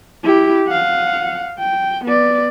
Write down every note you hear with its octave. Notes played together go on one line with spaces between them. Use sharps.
E4 G4
F5 F#5
G5
B3 D5